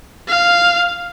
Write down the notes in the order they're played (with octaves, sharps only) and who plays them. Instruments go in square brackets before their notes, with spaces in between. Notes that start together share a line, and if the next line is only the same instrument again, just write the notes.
[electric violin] F5